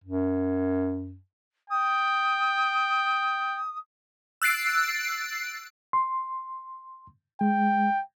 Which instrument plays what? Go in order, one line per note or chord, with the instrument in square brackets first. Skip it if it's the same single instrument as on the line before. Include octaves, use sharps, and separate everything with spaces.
[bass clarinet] F#2
[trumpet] G5 [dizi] D#6
[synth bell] E6 F#6 A6 C7 D7
[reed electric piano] C6
[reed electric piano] G#3 [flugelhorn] G5